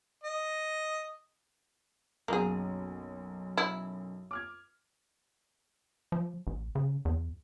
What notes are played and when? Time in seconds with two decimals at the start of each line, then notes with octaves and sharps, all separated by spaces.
0.23 D#5
2.28 B1 F#2 A#3 G#4
3.57 E4
4.31 D6 F6 G#6
6.12 F3
6.47 A1
6.75 C#3
7.05 E2